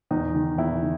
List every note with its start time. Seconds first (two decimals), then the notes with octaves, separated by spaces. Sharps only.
0.11 E2 D#4
0.35 D#3
0.58 E2 E4
0.82 D#3